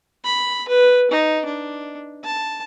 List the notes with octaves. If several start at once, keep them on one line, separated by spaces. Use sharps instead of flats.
B5
B4
D#4
D4
A5